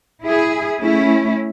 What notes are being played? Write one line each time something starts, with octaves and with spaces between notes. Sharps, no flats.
E4 G#4
A3 C#4 E4